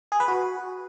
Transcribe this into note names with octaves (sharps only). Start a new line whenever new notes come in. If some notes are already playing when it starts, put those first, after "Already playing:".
G#4
B4
F#4